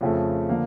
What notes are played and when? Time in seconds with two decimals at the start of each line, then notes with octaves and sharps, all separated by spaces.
0.01 F2 C#3 F3 A3
0.49 D3 F3 A#3